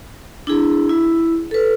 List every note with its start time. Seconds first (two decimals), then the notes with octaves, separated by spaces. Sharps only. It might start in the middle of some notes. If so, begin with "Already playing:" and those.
0.47 D4 E4 G#4
0.89 E4
1.51 A4 B4